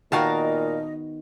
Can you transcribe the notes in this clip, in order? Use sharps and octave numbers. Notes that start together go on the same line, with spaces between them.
A#2 D#3 B3 F#4 A#4 D#5 F5 A5